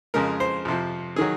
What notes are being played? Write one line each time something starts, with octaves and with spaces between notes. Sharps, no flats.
F2 C#3 G#3 A#4
C5
F2 C3 F3
D#3 F#3 G#4